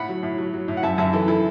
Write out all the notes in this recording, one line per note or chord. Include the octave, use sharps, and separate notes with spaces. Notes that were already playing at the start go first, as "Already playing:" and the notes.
Already playing: A2 F#5 B5
F#3
A2
F#3
F#3
A2
F#5
F#2 E5 A5
F#2 E5 A5
E3 E4 A4
E4 A4